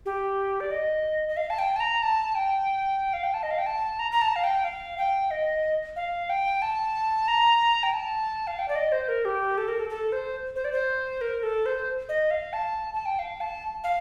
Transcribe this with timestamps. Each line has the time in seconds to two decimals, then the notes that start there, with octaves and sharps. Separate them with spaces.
0.06 G4
0.60 D5
0.71 D#5
1.29 D#5
1.37 F5
1.50 A5
1.59 G5
1.76 A5
1.80 A#5
2.02 A5
2.35 G5
3.13 F5
3.23 G5
3.34 A5
3.43 D#5
3.51 F5
3.58 G5
3.66 A5
3.99 A#5
4.12 A#5
4.22 A5
4.36 F5
4.44 G5
4.64 F5
4.98 G5
5.31 D#5
5.96 F5
6.30 G5
6.62 A5
7.28 A#5
7.83 G5
7.93 A5
8.47 F5
8.59 G5
8.68 D5
8.75 D#5
8.92 C5
9.09 A#4
9.25 G4
9.58 A4
9.68 A#4
9.79 A4
9.90 A4
10.12 C5
10.56 C5
10.65 D5
10.72 C5
11.21 A#4
11.43 A4
11.66 C5
12.09 D#5
12.31 F5
12.53 A5
12.94 A5
13.06 G5
13.19 F5
13.41 A5
13.84 F5